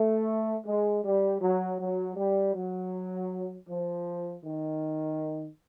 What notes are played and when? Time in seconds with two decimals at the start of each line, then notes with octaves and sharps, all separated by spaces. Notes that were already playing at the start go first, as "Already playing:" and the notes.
Already playing: A3
0.65 G#3
1.03 G3
1.40 F#3
1.78 F#3
2.16 G3
2.53 F#3
3.67 F3
4.43 D#3